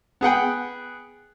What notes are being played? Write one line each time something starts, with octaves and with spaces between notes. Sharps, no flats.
B3 G#4 F#5 G5